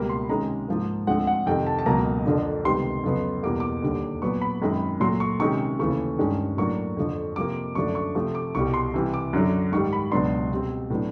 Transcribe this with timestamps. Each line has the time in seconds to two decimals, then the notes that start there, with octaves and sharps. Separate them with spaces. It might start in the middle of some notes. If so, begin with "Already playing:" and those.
Already playing: C#2 B2 G3 A#3 B5
0.09 C6
0.29 C3 D#3 G#3 C#4 A#5
0.68 G#2 F3 A#3
1.07 D2 D3 F3 G#3 C4 F#5
1.27 F#5
1.46 F2 C3 D#3 G5
1.67 A5
1.79 A5
1.86 C#2 B2 F#3 A#3 A#5
2.25 F2 D3 F3 A#3 D4
2.64 C#2 C3 D#3 G3 B3 C6
3.04 F2 C#3 F#3 B3
3.43 E2 B2 G3 A#3 D6
3.60 D6
3.82 D#2 D3 G3
4.22 A#2 F#3 B3 C#6
4.42 B5
4.62 F#2 D#3 G#3 C4
5.00 A#2 F#3 A3 C6
5.20 C#6
5.40 C3 D#3 G#3 C#4 C#6
5.79 D#2 C#3 E3 A3 C#6
6.19 G2 D#3 G#3 C#4
6.57 A2 F#3 A#3 D4 C#6
6.97 F2 D3 F3
7.36 C3 F3 A#3 D6
7.75 F#2 D3 F3 A3 D4 C#6
7.95 C#6
8.15 C3 F3 A3 C#6
8.35 D6
8.55 C2 B2 G3 C#6
8.74 C6
8.94 C3 E3 G3
9.14 D6
9.33 F#2 D3 F#3
9.72 G#2 D#3 G3 C#6
9.93 B5
10.11 C#2 B2 F#3 B3 D4 C6
10.51 B2 G3 C4
10.90 A2 F#3 B3 D4